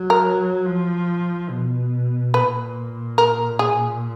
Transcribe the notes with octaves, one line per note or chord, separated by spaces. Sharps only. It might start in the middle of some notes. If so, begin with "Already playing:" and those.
Already playing: F#3
A#4
F3
B2
A#2 B4
A#4
G#4